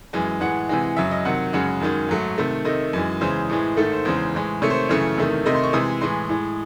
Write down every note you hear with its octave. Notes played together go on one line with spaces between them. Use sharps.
F#2 E3 G#3 G#5
A2 E3 G#3 F#5
C3 E3 G#3
F#2 C#3 F#3 E5
D#5
C3 D#3 F#3 F#5
F#2 C#3 G#3 F#5
F#2 D#3 G#3
G#2 F#3 A3
C3 D#3 A3
C3 D#3 A3 D#5
F#2 E3 G#3
E2 C#3 E3 G#3 C5
A2 E3 G#3
G#2 D#3 A3 A4
C5
E2 C#3 G#3 C5
A2 E3 G#3
C3 D#3 A3 C#5
C5
F#2 C#3 E3 A3 C#5
E2 C3 D#3 A3
C3 D#3 A3 D#5
C6
C#6
C3 E3 G#3 D#6
A2 E3 G#3 C6
A2 G#3